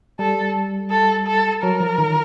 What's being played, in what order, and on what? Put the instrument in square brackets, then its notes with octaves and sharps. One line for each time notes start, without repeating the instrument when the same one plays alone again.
[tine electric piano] G3 [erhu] A4
[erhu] A4
A4
[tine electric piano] F#3 [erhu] A#4
[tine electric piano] F3
D#3